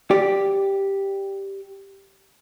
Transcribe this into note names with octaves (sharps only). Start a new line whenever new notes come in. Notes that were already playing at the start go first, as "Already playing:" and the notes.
G4 D5